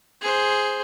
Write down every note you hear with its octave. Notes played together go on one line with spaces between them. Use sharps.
G#4 C5